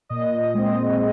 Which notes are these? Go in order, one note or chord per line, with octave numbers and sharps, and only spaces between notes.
A#2 D#5
G#3 C4